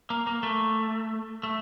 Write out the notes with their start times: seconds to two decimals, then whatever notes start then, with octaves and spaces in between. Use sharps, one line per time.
0.10 A#3
0.27 A#3
0.43 A3
1.43 A3